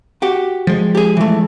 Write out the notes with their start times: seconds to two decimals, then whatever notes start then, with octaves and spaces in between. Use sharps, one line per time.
0.22 F#4 G4
0.67 F3 G#3
0.95 G4 G#4
1.17 E3 A3